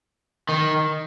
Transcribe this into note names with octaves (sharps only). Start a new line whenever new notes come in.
D#3